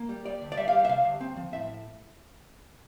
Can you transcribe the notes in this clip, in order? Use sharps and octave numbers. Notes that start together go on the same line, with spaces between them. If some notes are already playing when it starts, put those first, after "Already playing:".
Already playing: A#3
G3
G3 D5
D2
D5
G3 E5
F5
G3
E5
C3 F5
D2
C4
F3
A2 E5